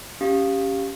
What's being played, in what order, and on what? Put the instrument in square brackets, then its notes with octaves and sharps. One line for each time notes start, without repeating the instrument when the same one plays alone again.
[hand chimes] C#4 G4 F5